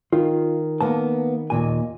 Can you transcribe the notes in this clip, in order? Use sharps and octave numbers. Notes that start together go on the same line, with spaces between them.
D#3 F4
A#3 B3 A5
D#2 A#2 G#5